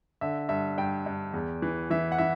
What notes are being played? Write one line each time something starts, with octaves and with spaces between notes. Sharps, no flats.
D3 E5
G2 E5
G2 G5
G2
E2
E3
E3 E5
F#5
E3 E5